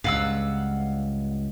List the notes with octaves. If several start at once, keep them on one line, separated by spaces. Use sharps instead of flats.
C#2 G2 F5 F#5 E6